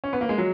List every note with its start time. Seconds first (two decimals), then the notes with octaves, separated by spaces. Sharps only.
0.04 C#4
0.13 B3
0.21 A#3
0.29 G#3
0.38 F#3